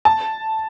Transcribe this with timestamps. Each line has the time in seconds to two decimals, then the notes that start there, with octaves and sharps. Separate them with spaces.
0.05 A5